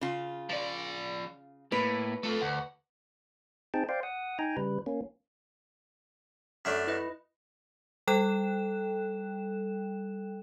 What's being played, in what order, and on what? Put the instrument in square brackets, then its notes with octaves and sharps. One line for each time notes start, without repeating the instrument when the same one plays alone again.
[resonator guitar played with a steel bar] C#3 F4
[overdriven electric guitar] F3 D5
[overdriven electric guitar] A2 [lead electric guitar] A#3 [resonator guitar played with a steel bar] B4
[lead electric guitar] A3 [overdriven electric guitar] F4 A4
[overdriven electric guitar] D2 [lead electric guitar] F#5
[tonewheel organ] C4 D#4 G#4 G5 A5
C5 D5 F5 G5
F#5 D#6
D#4 G5 G#5 A#5
C#3 G3 B4
A#3 C#4
[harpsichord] F#2 A3 D4
[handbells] E4 B4 D#5
[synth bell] G3 A4 G5 F#6 E7